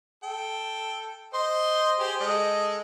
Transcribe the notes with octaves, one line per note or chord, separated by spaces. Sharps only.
A4 G5
C5 D#5 C6
G4 G#4 C5
G#3 A4 D#5